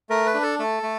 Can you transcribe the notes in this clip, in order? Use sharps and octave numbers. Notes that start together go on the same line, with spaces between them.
A3 A#4
B4
D4
A4
A3 A4
A3